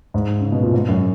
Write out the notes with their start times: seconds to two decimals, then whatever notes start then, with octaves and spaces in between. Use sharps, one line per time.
0.14 G#2
0.41 C#3
0.52 B2
0.62 A#2
0.73 G#2
0.88 F#2